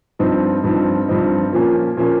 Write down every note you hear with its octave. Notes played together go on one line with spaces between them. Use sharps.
G2 F3 C4 D#4
G2 F3 C4 D#4
G2 F3 C4 D#4
A#2 F3 A#3 C#4
A#2 F3 A#3 C#4